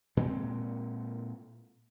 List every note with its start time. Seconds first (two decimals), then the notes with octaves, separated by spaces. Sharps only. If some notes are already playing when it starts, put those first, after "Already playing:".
0.17 A#2 G#3 C4